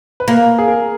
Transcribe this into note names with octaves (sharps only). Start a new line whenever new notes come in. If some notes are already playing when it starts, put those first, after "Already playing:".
B4
A#3 A#4
G#4
A#4